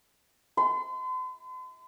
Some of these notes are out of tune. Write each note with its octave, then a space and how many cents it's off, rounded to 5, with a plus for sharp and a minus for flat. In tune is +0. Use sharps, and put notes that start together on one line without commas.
C6 -45